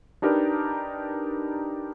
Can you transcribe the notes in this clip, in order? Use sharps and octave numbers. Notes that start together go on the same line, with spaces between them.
D4 D#4 G4 A#4 B4 D5